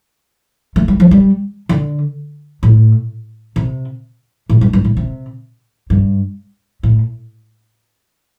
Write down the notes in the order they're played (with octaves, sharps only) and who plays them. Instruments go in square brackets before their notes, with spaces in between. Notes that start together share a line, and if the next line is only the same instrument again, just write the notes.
[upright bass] A3
G3
F3
G3
D3
A2
C3
A2
G2
G2
A2
C3
G2
A2